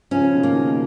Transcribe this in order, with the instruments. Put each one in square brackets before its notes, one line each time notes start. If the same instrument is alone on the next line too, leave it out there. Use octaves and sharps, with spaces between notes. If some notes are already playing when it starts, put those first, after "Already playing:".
[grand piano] C#3 F3 [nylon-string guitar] C#4
[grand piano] B2 D#3
[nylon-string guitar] A#3
[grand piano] B2 D#3